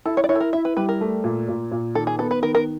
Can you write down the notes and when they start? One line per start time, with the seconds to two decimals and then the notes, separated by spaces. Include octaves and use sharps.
0.05 E4 A4
0.17 C#5
0.24 D5
0.29 E4 C#5
0.35 A4
0.40 A#4
0.53 E4 E5
0.65 B4
0.77 G3 B4
0.89 A#4
1.01 A3
1.24 A#2
1.48 A#2
1.71 A#2
1.95 D#3 A4
2.07 G#4
2.19 B3 A4
2.31 B4
2.42 D#3 A#4
2.55 A#4